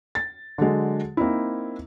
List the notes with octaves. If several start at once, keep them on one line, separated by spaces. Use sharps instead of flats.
A6
D3 F#3 G#3
A#3 C4 D#4 E4